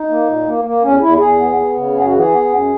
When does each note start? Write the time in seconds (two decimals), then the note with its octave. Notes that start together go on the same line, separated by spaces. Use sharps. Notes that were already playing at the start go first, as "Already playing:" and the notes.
Already playing: D#4
0.09 A#3
0.28 A#2
0.46 A#3
0.65 A#3
0.83 E2 C#4
1.01 E2 E4
1.20 E2 G#4
1.39 B3
1.57 B3
1.75 C#3
1.94 F#2 G#4
2.06 F#4
2.12 E3
2.18 G#4
2.31 B3
2.49 F#2